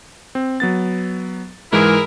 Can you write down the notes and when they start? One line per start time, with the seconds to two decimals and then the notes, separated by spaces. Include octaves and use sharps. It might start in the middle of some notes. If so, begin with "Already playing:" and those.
0.35 C4
0.60 F#3 B3 A6
1.73 G#2 E3 G#3 E4 G#4 A#4